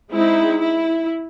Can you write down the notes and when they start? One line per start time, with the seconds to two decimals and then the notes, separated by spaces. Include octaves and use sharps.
0.11 G#3 C4 D#4 E4
0.61 E4